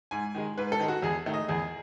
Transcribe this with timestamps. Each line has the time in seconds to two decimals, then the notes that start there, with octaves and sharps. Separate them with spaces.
0.11 G#2 G#5
0.35 D#3 G#3
0.58 G#2 B4
0.72 A4
0.79 D#3 G#3
0.88 F#4
1.02 E2 G#4
1.26 D#3 A3
1.34 D#5
1.48 E2 G#4